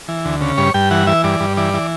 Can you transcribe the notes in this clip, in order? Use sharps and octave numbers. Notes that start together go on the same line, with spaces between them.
E3
D2
C#3
G2 C#5
G2 G5
E3 F#5
E3 E5
G2 D5
G2
E3 D5
E3